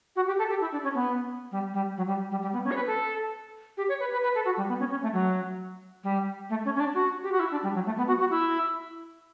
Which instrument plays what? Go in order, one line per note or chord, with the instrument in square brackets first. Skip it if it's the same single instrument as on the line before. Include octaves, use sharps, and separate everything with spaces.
[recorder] F#4
G4
A4
G4
E4
D4
C#4
B3
G3
G3
F#3
G3
G3
G3
B3
C#4
C#5
B4
A4
G4
C#5
B4
B4
B4
A4
F#4
G3
B3
C#4
C#4
A3
F#3
G3
A3
C#4
C#4
D4
F#4
G4
F#4
E4
D4
G3
F#3
A3
B3
F#4
F#4
E4